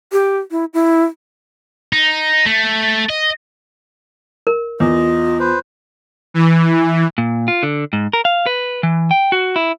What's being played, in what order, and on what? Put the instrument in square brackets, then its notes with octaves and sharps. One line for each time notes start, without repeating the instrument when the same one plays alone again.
[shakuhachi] G4
E4
E4
[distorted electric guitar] D#4
A3
D#5
[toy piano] A#4
[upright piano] E2 [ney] F4 [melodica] D#5
[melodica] B4 C5
[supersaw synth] E3
[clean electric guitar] A#2
F4
D3
G#2
A#4
F5
B4
E3
G5
F#4
E4